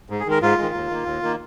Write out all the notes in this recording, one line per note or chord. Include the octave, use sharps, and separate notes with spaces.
G#2
G#4
D#3 G#3 A#4
G#2 F4
D#3 G#3
D#2
D#3 A#3
D#2
D#3 A#3